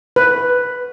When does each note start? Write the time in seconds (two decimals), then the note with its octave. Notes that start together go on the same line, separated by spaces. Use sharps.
0.16 B4